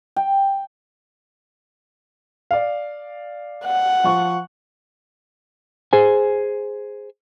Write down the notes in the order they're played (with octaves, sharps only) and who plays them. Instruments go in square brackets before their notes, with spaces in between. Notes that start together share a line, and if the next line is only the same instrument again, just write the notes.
[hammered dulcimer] G5
[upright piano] D5 F5
[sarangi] F#5
[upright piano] F3 C#6
[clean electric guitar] G#4 C5 G#5